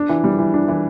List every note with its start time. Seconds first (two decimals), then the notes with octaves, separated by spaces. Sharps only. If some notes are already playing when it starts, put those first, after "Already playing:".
Already playing: D4
0.09 E3
0.24 G3
0.39 E3
0.54 D4
0.68 E3